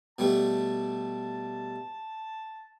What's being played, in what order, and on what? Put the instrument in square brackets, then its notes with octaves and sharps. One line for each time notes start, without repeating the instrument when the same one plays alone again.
[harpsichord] B2 G3 A3 [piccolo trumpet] A5